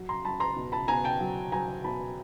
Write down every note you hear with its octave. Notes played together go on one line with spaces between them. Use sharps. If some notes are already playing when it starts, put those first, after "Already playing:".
Already playing: F#3
A#5 C6
F#3 A5 B5
A#5 C6
B2
A5 B5
B2 G#5 A#5
G5 A5
F#3
F#3 G#5 A#5
B2 A5 B5